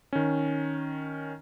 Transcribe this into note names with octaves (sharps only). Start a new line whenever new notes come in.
D#3 C#4